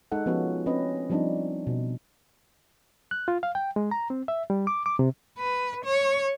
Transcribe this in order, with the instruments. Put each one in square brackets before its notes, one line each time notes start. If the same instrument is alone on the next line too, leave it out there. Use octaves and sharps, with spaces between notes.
[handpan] G#3 D#4 A4 F#5
F3 B3 C#4 F4 F#4
C4 C#4 B4 D#5
F3 G3 C4 D4 D#4
B2
[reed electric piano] F#6
F4
F5
G5
G#3
A#5
C4
E5
G3
D6
D6
C3
[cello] B4
C#5